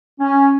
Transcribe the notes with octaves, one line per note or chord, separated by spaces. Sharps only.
C#4